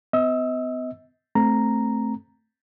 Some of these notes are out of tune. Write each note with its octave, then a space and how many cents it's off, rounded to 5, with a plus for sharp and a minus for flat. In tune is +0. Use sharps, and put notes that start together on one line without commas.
B3 +40 D#5 +40 E6 +5
A3 +0 C4 +0 A#5 +0